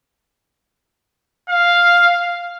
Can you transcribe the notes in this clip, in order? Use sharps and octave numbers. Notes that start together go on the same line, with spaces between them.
F5